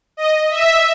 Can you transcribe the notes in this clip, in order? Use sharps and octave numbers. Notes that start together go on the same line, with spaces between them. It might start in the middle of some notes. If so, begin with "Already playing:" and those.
D#5
E5